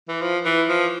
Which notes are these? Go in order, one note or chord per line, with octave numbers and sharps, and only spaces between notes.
E3
F3
E3
F3